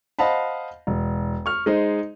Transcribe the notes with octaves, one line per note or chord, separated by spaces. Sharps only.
C5 D#5 F5 F#5 A5 B5
E1
C#6 F6
G#3 D#4 C5